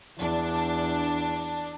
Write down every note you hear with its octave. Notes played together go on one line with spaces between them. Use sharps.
E2 D4